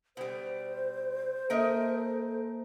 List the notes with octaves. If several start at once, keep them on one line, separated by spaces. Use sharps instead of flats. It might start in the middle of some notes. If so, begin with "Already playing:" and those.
B2 G3 C5
A#3 A4 A#4 D#5 E5